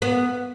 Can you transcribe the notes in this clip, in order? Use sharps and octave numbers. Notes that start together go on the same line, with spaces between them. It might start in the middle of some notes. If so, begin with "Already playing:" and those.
B3